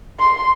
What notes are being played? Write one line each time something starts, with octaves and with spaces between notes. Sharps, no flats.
C6